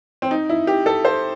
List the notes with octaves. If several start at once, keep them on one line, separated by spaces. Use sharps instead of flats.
C4
D#4
E4
G4
A4
C5